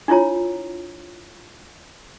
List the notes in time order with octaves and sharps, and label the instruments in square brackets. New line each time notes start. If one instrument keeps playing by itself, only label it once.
[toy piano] D4 E4 F4 C#5 A#5